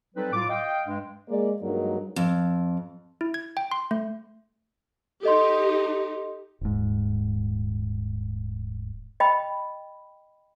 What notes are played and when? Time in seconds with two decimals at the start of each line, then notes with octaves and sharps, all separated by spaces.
0.15 F#3 G3 C4 D#4 A4 B4
0.32 A2 F#3 F4 D6
0.49 D#5 F5 G5
0.86 G2 G#3
1.29 G#3 A#3 G#4 D5
1.61 G2 F#3 G#3 A#3 D#4 A#4
2.16 F2
3.21 E4
3.34 G#6
3.57 G5
3.71 C6
3.91 A3
5.23 D#4 G4 A4 D#5 C6
6.61 D#1 G#2
9.20 D#5 G5 B5